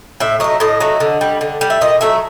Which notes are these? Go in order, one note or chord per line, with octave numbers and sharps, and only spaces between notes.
A2 E5
F#3 A3 D#5
A2 D#5
F#3 A3
D3
G3
D3
G3
E5
A#2 D#5
F#3 A3 E5